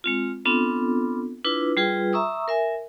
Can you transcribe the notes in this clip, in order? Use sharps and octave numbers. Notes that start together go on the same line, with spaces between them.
G#3 C4 F4
B3 C4 D4 F4 A4
D4 E4 F4 B4
G3 F4 G#4 B4 G5
E5 A#5 C#6 D#6 E6
A#4 E5 G#5